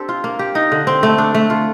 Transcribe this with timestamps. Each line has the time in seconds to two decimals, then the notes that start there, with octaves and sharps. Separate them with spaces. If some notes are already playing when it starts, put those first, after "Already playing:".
Already playing: C4 D4 G4 A4
0.09 F4
0.24 A#3
0.39 G4
0.55 D#4
0.72 D3
0.87 C4
1.03 A3
1.18 D4
1.35 A3
1.50 F4